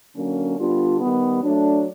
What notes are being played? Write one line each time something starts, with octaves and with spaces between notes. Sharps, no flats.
D3 F#3 A#3 C#4
D3 G3 B3 D4 F4
D#3 G3 B3
F#3 A3 D4